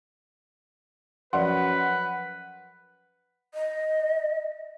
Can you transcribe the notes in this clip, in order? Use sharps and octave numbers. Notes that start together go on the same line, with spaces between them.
F#2 F3 B4 D5 F#5 C6
D#5